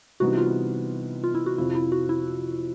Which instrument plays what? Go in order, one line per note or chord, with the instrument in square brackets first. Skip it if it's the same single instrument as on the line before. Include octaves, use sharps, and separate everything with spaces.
[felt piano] C3 E3 G3 B3 D#4 [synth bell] F#4
[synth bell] F4
F4
E4
F#4
[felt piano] F2 C3 F3 [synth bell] E4
[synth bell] E4
F#4
E4